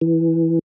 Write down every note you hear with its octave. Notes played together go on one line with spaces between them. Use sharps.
E3